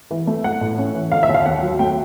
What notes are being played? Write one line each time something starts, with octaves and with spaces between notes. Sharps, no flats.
E3
A3
A3 F#5
A2
C#4
E3
D3 F5
E5
D#2
F5
D#2 F#5
F#3
A3 G5